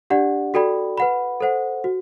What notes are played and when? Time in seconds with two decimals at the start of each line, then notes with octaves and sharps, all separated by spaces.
0.10 D4 G4 D5 F#5
0.54 F#4 A4 D5 G5 B5
0.98 B4 F#5 B5
1.41 A4 C5 F#5
1.84 F#4